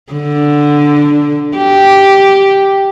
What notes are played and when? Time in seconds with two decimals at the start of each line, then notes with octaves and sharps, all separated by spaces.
0.12 D3
1.57 G4